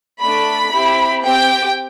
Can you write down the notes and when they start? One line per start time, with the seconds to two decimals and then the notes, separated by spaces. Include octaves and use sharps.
0.21 A3 D4 A4 B5
0.72 C4 E4 G4
1.23 C4 G4 G5